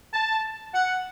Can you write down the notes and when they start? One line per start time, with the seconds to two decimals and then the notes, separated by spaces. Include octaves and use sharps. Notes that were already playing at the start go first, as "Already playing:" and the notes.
0.13 A5
0.74 F#5